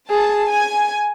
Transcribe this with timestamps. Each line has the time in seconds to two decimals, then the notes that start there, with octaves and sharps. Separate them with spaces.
0.10 G#4 A5
0.50 G#5